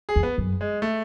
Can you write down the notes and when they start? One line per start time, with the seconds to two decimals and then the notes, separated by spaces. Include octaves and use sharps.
0.09 G#4
0.16 E2
0.23 B3
0.38 F#2
0.61 G#3
0.82 A3